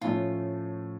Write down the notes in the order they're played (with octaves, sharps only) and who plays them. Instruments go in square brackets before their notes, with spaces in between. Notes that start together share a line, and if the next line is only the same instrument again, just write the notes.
[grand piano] A2 F3 A3 C#4 [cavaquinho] F4